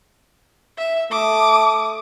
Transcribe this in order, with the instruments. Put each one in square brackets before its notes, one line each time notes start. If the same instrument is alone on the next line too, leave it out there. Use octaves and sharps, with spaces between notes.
[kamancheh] E5
[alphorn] A3 [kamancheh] D6 D#6